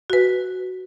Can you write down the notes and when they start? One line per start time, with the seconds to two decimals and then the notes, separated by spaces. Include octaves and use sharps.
0.10 F#4 B4